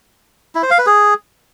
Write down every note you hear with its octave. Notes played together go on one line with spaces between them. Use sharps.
E4
C5
F5
B4
G#4